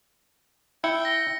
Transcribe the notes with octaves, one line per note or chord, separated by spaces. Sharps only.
E4 G5 C#7
A#6 G7